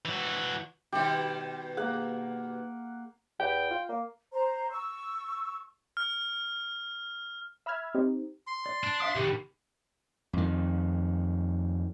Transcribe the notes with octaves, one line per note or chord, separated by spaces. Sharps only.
E3 F#4
B2 D#3 G3 G4
A#3 G#4 F#5
E2 G5
F4
A#3
C5 A#5
C#6 E6
F6
E5 B5 E6 F6 G#6
C4 D#4 G4
C6
D5
D4
E5 F5 D#6
C2 B2 D#3 G4 G5 D6
F2 D#3